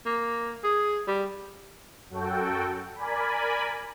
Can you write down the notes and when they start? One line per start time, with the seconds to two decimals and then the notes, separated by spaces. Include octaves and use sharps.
0.06 A#3
0.64 G#4
1.08 G3
2.10 F#2 F#4 A4 G5
2.96 A#4 D5 G#5 B5